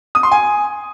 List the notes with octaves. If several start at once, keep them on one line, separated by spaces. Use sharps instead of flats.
D#6
C6
G#5